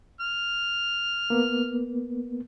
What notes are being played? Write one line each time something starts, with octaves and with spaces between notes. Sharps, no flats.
F6
A#3 B3